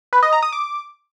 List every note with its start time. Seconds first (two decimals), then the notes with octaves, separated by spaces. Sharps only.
0.13 B4
0.23 D#5
0.33 A#5
0.43 D#6
0.53 D6